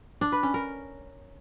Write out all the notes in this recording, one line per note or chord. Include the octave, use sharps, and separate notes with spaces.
D4
B4
C#4
A#4